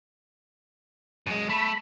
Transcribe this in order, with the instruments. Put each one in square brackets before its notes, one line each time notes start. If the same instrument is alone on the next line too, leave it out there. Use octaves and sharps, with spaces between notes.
[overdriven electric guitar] F#2 G#3
[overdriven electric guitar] A3 [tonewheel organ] B5